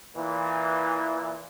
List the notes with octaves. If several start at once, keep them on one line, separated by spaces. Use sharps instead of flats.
A#2 E3